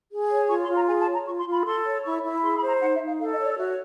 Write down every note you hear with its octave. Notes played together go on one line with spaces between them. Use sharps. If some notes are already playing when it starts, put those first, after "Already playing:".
G#4
C#5
F4 C#6
C6
F4
A#5
G#4 G#5
A5
C#5
A#5
F4 C#6
C6
F4
B5
A4 C6
C#5
E4 C#6
E4
G#4 C6
B5
C5
A#5
D#4 F#5
E5
D#4
F5
A4 F5
D#5
C#5
D5
F#4 E5